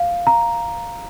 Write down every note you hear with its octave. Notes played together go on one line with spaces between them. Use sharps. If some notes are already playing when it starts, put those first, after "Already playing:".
Already playing: F5
A#5